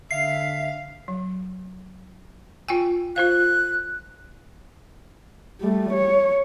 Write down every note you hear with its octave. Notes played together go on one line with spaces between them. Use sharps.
D3 E5 F5 C7
F#3
F4 G5 G#5
F4 C5 F5 F#6
G3 A3
C#5